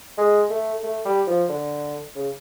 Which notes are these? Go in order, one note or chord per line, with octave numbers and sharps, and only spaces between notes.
G#3
A3
A3
G3
F3
D3
C#3